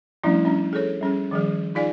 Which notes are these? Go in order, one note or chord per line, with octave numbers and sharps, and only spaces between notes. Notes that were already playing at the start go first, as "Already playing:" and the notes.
F3 G3 A3 C#4 D4 E4
G3 C#4 D4
G#4 A4 C#5
G3 C#4 G#4
D#3 F3 G3 G#4
D#4 F4 G#4 D5 F5 G#5